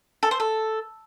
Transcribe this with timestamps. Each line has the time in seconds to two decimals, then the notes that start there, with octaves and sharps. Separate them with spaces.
0.23 A4
0.31 C5
0.40 A4